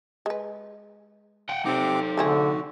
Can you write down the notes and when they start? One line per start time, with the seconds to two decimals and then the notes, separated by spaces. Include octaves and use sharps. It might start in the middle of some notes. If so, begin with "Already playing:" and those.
0.26 G#3 B4
1.49 F#5 G5
1.65 C3 C4 D#4 A4 D6
2.17 D3 A3 C4 F#4 G#4